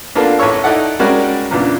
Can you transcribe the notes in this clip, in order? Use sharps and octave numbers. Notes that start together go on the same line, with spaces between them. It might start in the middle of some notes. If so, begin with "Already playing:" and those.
A#3 B3 D4 F4 A4
A1 A4 C#5 C#6 E6
D#4 E4 A4 D5 F#5
G3 G#3 C#4 F#4 A#4 D5
E2 A#2 C#3 B3 D4